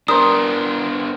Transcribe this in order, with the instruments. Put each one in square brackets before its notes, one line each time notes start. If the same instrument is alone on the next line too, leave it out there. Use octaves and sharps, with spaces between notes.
[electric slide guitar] B3 D4 [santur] A#4 C5 [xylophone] D#6